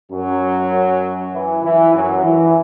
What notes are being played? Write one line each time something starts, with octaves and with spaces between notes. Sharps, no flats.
F#2 F#3
E3
E3
F#2 F#3
E3